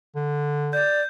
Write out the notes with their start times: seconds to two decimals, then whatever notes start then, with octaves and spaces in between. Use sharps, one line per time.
0.15 D3
0.73 D5 G6